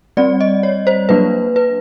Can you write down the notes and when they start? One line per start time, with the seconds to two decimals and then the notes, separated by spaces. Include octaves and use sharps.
0.17 G3 C4 D5
0.41 D#5
0.63 C#5
0.87 C5
1.09 F#3 A#3 D4 B4
1.56 B4